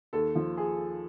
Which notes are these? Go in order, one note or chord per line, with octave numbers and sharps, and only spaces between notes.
D#2 A4
F3
G#4